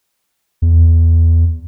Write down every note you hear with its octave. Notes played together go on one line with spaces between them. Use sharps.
E2